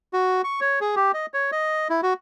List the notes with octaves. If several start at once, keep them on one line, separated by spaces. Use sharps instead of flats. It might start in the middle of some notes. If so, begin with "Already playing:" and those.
F#4
C#6
C#5
G#4
G4
D#5
C#5
D#5
E4
F#4